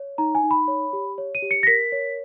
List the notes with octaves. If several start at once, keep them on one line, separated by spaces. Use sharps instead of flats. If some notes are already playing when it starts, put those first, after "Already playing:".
Already playing: C#5
D#4 A#5
G#5
D#4
B5
C#5
G4
C#5
D#7
G4
C#7
A#6
A#4 B6
C#5